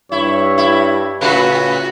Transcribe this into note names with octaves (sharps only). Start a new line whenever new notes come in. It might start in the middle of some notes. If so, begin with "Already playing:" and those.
G2 E4 C#5
E4
A2 C#3 F#4 B4